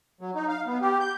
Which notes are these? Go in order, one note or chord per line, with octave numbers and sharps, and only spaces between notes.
F#3
D#4
F5
B3
G4
G6